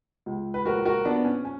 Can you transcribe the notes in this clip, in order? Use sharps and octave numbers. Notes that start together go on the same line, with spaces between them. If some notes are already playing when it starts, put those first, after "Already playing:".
C#2
B4
A#1 F#4 A#4
F#4 A#4
A#1 B3 D4
C#4
C#4